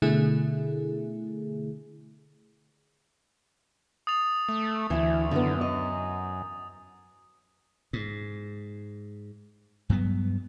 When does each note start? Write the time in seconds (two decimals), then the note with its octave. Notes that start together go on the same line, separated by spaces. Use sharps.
0.02 B2 D3 A3 E4 G#4
4.07 D#6 A6 F7
4.49 A3
4.90 D2 E3 E4
5.31 F#2 D3 D#3 B3
5.61 D#5
7.93 G#2
9.89 G2 F#3 B3